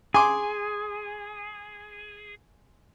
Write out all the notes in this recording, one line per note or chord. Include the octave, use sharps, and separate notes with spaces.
G#4 G#5 C6 D6